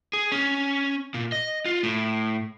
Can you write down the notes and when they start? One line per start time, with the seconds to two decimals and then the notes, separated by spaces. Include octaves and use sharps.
0.13 G#4
0.32 C#4
1.14 A#2
1.32 D#5
1.65 F4
1.83 A2